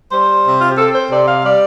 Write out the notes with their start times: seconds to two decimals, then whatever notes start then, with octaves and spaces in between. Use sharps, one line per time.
0.12 G3 C5
0.45 C3
0.61 F4
0.70 G4
0.78 C4 A4
0.95 C5
1.11 C3 D5
1.28 F5
1.45 G3 D5